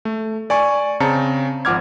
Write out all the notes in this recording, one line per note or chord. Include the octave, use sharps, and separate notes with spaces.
A3
D5 G#5 C#6
C#3 C4 A5 A#5 C#7
G#1 F3 F#5 D6 F6 G#6